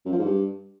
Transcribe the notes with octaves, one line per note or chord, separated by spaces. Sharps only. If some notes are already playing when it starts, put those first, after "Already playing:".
F#2
F3
G#2
G2